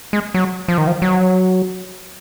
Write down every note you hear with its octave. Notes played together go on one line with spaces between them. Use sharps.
G#3
F#3
F3
D#3
F3
F#3